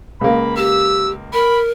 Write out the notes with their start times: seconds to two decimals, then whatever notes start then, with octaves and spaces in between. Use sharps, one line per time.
0.21 C#2 A#3 B5
0.57 G4 E6
1.33 A#4 B5